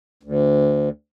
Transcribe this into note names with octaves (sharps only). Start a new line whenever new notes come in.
D2